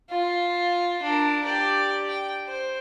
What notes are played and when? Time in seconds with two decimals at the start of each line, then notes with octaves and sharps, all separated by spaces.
0.10 F4
1.02 D4 A#4
1.44 G4 D5
2.08 G5
2.47 C5